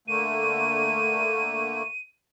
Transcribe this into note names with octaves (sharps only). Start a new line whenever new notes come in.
D3 A3 A#3 D#7